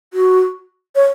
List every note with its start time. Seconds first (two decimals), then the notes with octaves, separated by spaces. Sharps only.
0.14 F#4
0.95 C#5